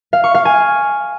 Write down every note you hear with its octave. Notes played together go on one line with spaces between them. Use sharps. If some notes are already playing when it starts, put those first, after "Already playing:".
F5
C#6
F5
G#5